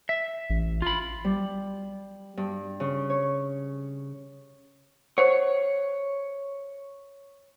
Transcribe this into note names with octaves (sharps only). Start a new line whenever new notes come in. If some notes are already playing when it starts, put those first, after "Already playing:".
E5
A1
F4 B5
G3
G2
C#3
C#5
C5 C#5 F#5